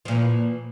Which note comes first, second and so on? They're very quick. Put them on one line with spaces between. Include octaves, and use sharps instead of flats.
F3 A#2 E3